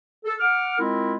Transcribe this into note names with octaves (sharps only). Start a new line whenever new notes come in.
A4
F#5 D6 F6
G#3 C4 E4 F4 A#4